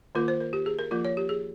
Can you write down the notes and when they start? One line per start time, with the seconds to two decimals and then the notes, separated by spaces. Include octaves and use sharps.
0.15 D#3 A#3 F4 A#4
0.28 C5
0.41 A#4
0.53 G4
0.66 G#4
0.79 A#4
0.91 F3 A#3 F4 A#4
1.05 C#5
1.17 G4
1.29 G#4